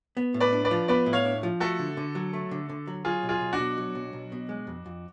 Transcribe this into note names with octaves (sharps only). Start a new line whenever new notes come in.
B3
A2
B4 D5
D4
B4 D5
F3
B3 B4 D5
A2
C#5 F5
D4
F3
A3 F#4 A4
D3
D3
F#3
A3
D3
D3
F#3
F#3 F4 G#4
B1
F4 G#4
B1
D4 F#4
B2
F#3
B1
B1
B2
G#3
F2
F2